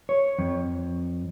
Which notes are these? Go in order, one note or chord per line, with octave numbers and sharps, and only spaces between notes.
C#5
F2